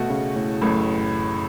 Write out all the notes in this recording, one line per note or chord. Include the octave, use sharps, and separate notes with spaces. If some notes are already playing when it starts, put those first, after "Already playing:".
Already playing: B2 A3 F#4
C#3
A2
A1 F#2 A2 A3